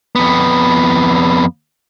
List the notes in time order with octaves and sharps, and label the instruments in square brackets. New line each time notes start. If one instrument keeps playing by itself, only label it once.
[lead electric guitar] F2 B3